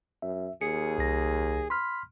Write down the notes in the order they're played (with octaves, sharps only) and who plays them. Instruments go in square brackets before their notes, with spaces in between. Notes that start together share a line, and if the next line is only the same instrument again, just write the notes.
[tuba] F#2 [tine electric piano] E5
[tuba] D#2 [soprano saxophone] G#4 [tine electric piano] C#7
[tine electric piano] C2 A#6
[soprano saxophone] B5 [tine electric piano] C6 F6